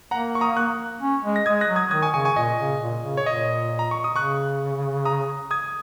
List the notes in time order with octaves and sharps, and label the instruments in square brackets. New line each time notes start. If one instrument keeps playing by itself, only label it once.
[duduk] A#3 [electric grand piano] F#5 A#5
[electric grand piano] C#6
A#5 D#6
C#6 F#6
[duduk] C#4
G#3
[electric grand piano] A#6
[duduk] G#3 [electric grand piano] D#6 G#6
[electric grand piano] F#6 A#6
[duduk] F#3
[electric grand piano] D#6 G#6
[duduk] D#3 [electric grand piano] D#6 G#6
[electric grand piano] G#5 C#6
[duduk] C#3 [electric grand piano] G#5 C#6
[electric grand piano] G#5 C#6
[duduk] A#2 [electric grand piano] D#5 G#5
[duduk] C#3
A#2
C#3
[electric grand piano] C#5
[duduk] A#2 [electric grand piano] D#5
[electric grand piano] A#5
C#6
D#6
[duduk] C#3 [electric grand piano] C#6 F#6
[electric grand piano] A#5 D#6
D#6 G#6